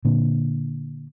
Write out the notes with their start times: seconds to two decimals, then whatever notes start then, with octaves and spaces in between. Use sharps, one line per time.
0.05 A#2 D3